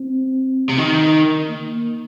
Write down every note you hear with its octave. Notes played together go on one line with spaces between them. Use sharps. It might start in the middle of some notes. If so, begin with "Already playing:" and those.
Already playing: C4
C3
D#3
A#3